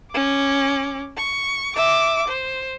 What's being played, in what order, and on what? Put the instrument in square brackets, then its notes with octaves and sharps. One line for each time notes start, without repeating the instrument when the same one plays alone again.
[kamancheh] C#4 D6
C#6
E5 D6
C5